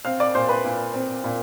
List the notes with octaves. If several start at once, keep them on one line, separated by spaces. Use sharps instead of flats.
C4 F5 F6
D5 D6
A#2 C5 C6
B4 B5
A#2
C4
A#2